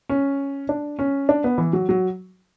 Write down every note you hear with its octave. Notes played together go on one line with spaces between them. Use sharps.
C#4
D4
C#4
D4
B3
E3
F#3
F#3